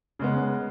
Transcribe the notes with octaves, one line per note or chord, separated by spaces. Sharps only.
C#3 G#3 B3